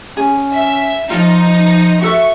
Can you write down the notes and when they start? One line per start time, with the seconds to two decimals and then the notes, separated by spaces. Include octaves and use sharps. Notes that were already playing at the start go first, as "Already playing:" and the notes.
0.17 C#4 G#4
0.53 E5
1.10 F3 D#4 F4
2.02 F#4 A4 E5 C#6